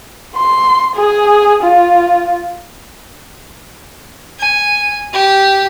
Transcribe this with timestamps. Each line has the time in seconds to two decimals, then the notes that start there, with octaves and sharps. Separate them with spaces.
0.37 C6
0.96 G#4
1.63 F4
4.39 G#5
5.13 G4